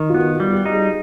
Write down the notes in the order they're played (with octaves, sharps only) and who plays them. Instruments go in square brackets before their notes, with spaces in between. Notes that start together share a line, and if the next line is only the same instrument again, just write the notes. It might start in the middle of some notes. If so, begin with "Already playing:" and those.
Already playing: [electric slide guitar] D#3
[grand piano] F4
[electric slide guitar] B3 [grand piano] F#4
[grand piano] F#4
[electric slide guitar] G3
[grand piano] G4
[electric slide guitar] D#4
[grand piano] G#4